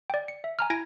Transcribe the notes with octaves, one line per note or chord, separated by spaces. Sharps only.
D5 G5
C#7
E5
G#5 A#5 F6
E4 G#5 G#6 A#6 D7